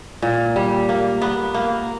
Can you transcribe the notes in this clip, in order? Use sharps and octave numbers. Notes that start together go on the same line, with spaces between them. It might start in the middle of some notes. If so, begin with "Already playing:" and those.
A#2
G3
A#3
B3
A#3